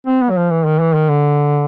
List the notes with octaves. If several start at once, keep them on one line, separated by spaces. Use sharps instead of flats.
C4
B3
F#3
F3
E3
D#3
E3
D#3
D3